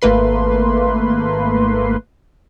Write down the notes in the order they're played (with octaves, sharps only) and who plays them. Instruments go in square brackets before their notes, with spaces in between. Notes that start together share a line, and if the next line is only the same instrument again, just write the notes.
[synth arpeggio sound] G#1 A3 A#3 B4 C6